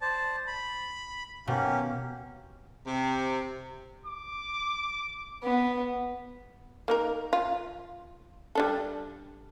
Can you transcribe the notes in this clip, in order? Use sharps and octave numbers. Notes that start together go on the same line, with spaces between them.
C5 D5 A5
B5
B2 A#3 C#4 G4
C3
D6
B3
A#3 D#4 A#4
F4
G3 D4 A4